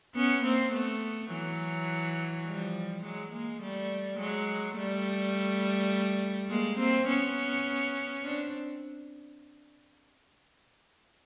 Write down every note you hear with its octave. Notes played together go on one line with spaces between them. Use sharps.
B3 C#4
A#3 C4
A3 B3
E3 F#3
F3 G3
F#3 G#3
G#3 A#3
G3 A3
F#3 G#3
G3 A3
G#3 A#3
A#3 C4
B3 C#4
C4 D4